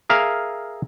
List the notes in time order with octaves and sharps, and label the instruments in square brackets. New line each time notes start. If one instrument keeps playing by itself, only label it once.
[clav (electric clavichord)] G#4 A#4 E5 F5